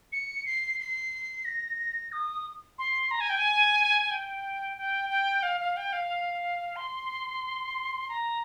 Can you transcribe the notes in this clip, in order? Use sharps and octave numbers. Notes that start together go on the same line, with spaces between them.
C#7
C7
C7
A#6
D#6
C6
A#5
G#5
G5
G#5
G5
G5
G5
F5
F5
G5
F5
C6
A#5